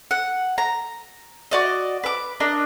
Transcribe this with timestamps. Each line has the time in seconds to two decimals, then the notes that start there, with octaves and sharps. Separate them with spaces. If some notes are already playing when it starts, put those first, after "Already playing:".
0.11 F#5
0.58 A#5
1.51 F#4 D5 D#5
2.04 B4 D6
2.40 D4 A#4 D#5